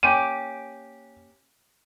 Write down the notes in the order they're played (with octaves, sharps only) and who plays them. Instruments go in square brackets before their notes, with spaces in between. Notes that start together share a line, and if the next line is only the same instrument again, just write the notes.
[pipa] A#3 C#4 G4 [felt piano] D#7